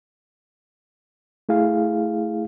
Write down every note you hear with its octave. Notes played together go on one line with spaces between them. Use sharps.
A3 E4 G#4 F5